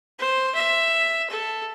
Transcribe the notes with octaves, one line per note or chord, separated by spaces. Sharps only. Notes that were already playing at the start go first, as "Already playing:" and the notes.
C5
E5
A4